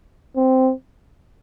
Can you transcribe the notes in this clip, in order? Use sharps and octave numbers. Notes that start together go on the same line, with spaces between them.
C4